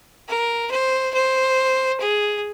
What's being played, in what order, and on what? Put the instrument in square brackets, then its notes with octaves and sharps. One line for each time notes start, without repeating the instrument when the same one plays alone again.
[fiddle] A#4
C5
C5
G#4